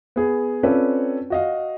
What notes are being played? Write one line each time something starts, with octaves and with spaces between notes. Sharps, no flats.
B3 G#4
C4 C#4 F4 A4 B4 D5
F#4 D#5 F5